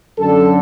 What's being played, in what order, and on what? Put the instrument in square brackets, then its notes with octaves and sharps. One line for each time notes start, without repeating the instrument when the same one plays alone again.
[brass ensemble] F#2 D3 A4